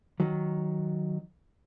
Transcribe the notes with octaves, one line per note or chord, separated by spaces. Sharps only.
D#3 F#3